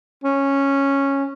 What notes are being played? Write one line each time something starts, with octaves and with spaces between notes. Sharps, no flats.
C#4